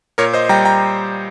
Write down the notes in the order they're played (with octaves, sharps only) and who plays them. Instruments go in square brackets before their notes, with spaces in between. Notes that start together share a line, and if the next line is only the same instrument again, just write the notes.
[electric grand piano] A#2 A#4 C#5
C5 D#5
G3 G5 A#5
G5 A#5